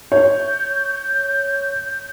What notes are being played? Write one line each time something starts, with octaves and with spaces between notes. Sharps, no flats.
C#5 G6